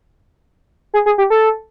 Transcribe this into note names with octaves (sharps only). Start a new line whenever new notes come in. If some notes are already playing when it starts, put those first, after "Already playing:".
G#4
G#4
G4
A4